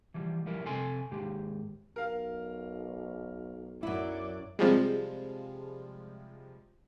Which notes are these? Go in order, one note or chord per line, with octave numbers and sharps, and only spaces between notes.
E3 F3 G3
F3 G3 E4 A#4
F2 C3 A4 G#5 C6
D#2 G#2 G#3 G4
B1 A#4 F5
F#2 F#3 E4 D5
C3 F3 G3 G#3